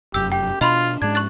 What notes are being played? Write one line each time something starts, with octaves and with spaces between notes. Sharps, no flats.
F1 F#2 G4 E6
G4 G5
B2 D4 F4 D#5 B5 C6
G#2 G#3 C#4 D4 G#6
C#6 F#6 A6